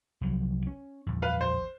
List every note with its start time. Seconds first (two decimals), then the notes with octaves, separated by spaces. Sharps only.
0.21 C2 F3 F#3
0.67 C#4
1.06 A#1 E2
1.22 B4 F5
1.41 C5